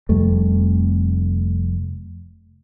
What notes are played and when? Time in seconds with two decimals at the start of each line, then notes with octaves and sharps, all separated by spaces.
0.09 F1 F2 G3 A3